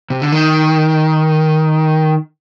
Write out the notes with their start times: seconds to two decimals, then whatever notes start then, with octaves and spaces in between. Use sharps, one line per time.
0.10 C3
0.22 D3
0.32 D#3